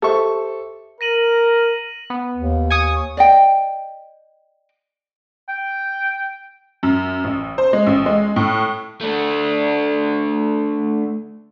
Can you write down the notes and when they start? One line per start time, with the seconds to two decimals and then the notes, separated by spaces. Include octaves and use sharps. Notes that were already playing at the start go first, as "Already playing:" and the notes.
0.02 G4 A4 C5 E5 C#6
1.01 A#4 A#6 D#7 F#7
2.10 B3
2.35 D#2
2.70 G#5 C#6 D#6
3.17 D5 D#5 G5
5.49 G5
6.83 F#2
7.24 A1
7.58 C5
7.73 G#3
7.87 A1
8.06 G#3
8.36 A2
9.01 A3 D4